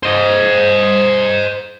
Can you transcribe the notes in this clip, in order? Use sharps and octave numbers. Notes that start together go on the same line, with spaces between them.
C5 D#5